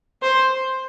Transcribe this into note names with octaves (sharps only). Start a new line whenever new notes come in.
C5